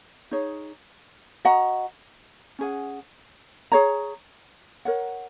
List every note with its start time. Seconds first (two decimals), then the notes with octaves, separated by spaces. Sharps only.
0.31 D#4 G#4 C#5
1.45 F#4 D#5 F#5 A#5
2.59 C#4 G#4 F#5
3.72 G#4 C#5 A#5
4.85 A#4 C#5 F#5